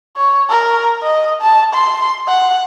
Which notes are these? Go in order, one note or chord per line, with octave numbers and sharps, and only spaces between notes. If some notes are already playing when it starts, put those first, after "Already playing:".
C#5
A#4
D#5
A5
C6
F#5